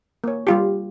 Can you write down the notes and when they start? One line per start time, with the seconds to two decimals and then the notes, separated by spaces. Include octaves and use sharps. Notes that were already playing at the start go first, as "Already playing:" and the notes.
0.24 A#3 C#5
0.47 G3 F4 G4